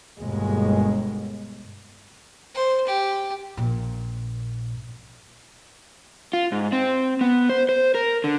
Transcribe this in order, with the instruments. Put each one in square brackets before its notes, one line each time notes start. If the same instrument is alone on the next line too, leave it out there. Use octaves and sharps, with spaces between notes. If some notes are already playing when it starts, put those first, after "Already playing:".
[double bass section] G1 D#2 B2 G#3
[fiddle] C5
G4
[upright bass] A#1 A#2
[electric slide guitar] F4
G#2
C4
B3
C5
C5
A#4
D3